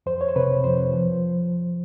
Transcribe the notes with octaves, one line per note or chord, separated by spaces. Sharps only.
F2 C5
C#5
C5
C3 B4
F2 C5
F3